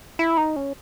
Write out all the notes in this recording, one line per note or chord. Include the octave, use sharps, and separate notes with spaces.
E4
D#4
C#4